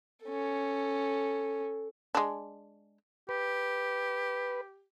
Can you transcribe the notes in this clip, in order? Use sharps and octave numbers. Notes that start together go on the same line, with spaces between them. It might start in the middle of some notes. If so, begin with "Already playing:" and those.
C#4 A4
G#3 D4
G4 B4